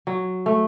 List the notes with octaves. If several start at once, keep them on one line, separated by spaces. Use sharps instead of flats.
F#3
A3